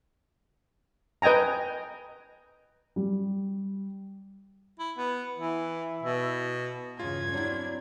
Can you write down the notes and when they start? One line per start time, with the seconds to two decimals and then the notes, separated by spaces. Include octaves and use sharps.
1.22 B4 D#5 G5 G#5 A#5
2.96 G3
4.79 E4
4.98 B3
5.38 E3 E4
6.03 B2
7.00 E2 G2 C#3 F4 G#6
7.34 F#3 C4 D4 E4